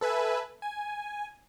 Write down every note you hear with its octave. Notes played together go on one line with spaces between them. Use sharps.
A4 B4 E5 G#5
G#5